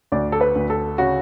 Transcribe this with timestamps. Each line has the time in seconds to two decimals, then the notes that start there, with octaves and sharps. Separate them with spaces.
0.12 D2 D5
0.32 A4
0.41 B4
0.56 D2
0.70 A4
0.98 C#3 F#4